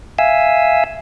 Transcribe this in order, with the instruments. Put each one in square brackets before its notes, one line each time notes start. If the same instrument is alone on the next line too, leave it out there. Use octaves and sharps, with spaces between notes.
[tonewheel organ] E5 F5 G#5 E6